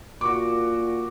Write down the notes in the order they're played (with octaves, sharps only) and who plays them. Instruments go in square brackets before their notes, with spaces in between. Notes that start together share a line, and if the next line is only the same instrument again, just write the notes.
[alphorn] A#2 [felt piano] F#4 C#6 D6